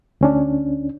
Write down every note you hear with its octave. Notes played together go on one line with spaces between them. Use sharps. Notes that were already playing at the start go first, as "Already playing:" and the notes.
D2 C#4 D4